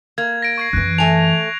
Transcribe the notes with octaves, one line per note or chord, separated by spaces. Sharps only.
A#3 G#6
A#6 D7
C#6 G#6 C7
F#2 E3 F#6
A3 G#5 A5 F7